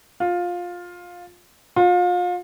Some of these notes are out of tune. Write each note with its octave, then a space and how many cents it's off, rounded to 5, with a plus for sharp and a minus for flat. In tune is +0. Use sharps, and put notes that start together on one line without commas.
F4 +15
F4 +35